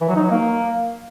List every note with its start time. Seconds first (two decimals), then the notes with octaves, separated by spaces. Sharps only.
0.01 E3
0.09 F#3
0.16 D#4
0.23 F#3
0.31 A#3